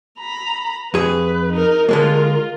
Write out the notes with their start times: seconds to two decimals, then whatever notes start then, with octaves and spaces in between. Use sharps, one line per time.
0.20 A#5 B5
0.94 F2 G#4 B4
1.52 D#4 A#4
1.89 D3 G#3 A#3 F4 A#4